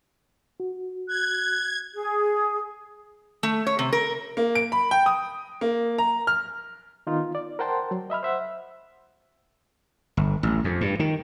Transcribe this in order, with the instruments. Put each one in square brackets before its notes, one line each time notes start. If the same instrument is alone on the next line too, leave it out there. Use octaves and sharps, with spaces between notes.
[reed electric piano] F#4
[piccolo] F#6 [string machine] G#6
[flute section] G#4
[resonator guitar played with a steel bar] A3
C#5
C3
A#4
[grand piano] A#3
D7
B5
G5
D#6
A#3
A#5
F6
[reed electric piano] D#3 B3 D#4 F4
D5
A#4 C5 F#5 G5 A5 C6
F#3
D#5 E5 B5 F6
C5 E5 F#5
[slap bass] G1
A1
F2
G2
D#3